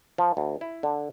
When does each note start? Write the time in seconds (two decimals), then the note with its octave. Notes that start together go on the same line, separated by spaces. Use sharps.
0.18 F3
0.37 D2
0.61 E4
0.83 D3